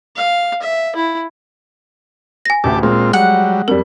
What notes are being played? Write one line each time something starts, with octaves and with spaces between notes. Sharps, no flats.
F5
E5
E4
G#5 A#6
A1 D2 G4 A5 D6
A#2 G#3 C4 F4
F#3 G3 F#5
F2 G3 A#4